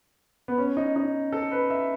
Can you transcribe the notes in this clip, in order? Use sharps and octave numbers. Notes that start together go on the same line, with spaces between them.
B3
C#4
D#4
D#4
A4
B4
E5